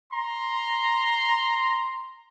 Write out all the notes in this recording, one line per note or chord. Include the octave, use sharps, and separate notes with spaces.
A#5 C6